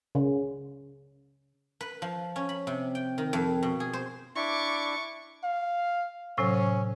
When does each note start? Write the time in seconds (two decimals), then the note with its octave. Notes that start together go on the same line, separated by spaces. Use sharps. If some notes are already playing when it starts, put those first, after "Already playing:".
0.15 C#3
1.81 B4
2.02 F3
2.36 C#4
2.49 B5
2.67 C3
2.95 G5
3.18 D#3
3.33 F2
3.63 B2
3.80 G#4
3.93 C5
4.36 D4 E4 C#6 D6
5.44 F5
6.38 A2 C3 F#3 C#4